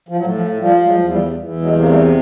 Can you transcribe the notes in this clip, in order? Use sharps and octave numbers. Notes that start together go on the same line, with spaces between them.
F3
F#3
A2 F3
F3
F3 G3
F#3 G#3
E2
F3 G3
E2
F#3 G#3
C3
A#3
G3 A3